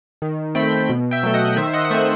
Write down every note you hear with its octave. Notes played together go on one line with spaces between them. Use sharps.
D#3
A3 C4 G5 B5
B2
E5 G5
F#3 A3
D#5 F#5
D#3 C5 E5
D#5 F#5
F#5
A3 C4 C5 E5